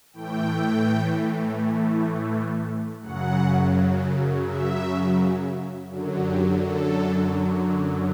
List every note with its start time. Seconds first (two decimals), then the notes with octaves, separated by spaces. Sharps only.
0.13 A2 E3 A3 G5
3.01 F#2 C#3 F#3 F#5
4.46 E5
5.90 F#2 D3 F#3
6.26 G4
6.62 A4